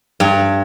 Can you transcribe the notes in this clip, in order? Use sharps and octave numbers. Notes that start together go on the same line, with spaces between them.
G2